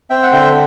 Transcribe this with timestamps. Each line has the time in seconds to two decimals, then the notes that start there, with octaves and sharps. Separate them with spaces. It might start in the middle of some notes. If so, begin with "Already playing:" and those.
0.10 C4 E5 G5
0.23 F#5
0.32 D3 E5 G5